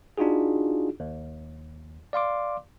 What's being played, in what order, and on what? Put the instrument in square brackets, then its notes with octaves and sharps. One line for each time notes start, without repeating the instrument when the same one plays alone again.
[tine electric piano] D4 D#4 F4 F#4 G#4
D#2
D5 F5 C6 D6